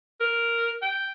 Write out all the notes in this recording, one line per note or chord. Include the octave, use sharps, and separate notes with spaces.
A#4
G5